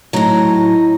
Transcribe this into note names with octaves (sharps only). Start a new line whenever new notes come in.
A2 F#3 D#4